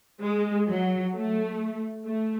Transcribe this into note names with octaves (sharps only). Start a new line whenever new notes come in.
G#3
F#3
A3
A3